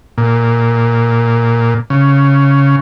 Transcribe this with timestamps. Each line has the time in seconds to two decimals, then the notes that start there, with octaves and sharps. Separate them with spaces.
0.18 A#2
1.90 C#3